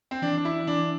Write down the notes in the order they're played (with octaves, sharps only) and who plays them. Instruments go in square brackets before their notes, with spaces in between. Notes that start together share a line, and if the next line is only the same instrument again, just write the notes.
[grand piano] C4
[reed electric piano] E3 [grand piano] D4
[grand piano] D4
E4
[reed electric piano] E3 [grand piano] D4